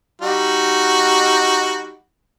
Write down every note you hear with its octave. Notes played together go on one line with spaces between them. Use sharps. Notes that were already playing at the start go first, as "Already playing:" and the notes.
G3 D#4 F#4